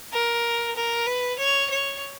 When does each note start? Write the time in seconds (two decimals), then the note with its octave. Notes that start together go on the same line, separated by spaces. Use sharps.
0.12 A#4
0.76 A#4
1.07 B4
1.39 C#5
1.71 C#5